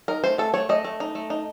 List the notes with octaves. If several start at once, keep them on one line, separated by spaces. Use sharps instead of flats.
D#4 A#4
A3 C5
A3 A4
A3 C#5
A3 D#5
A3
D#4
A3
D#4